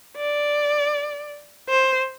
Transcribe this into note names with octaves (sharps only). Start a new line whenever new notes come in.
D5
C5